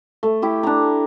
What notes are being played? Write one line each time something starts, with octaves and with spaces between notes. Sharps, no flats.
A3
E4 G4
D4 A#5